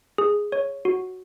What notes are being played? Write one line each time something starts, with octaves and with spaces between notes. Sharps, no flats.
G#4
C#5
F#4